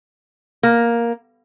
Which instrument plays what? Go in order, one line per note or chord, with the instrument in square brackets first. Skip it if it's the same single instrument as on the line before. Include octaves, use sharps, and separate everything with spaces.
[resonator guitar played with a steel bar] A#3